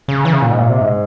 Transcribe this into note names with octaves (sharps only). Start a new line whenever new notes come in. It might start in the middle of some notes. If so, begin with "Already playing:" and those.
C#3
E3
C#3
A#2
G#2
A#2
C3
G#2